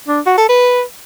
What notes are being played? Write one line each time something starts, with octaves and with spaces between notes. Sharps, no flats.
D4
F#4
A4
B4